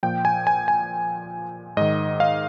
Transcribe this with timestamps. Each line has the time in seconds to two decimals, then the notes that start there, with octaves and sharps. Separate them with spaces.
0.03 A#2 F3 G5
0.25 G#5
0.47 G#5
0.68 G#5
1.77 G#2 D#3 D#5
2.20 F5